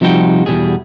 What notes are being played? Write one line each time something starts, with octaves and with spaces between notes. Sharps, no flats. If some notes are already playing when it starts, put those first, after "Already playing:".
C3 F3 G3 D#4 F#4 G5
E2 G2 B2 G3 G#4